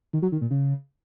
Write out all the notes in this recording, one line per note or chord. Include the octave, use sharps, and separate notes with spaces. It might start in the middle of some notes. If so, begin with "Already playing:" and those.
D#3
F#3
D#3
A#2
C#3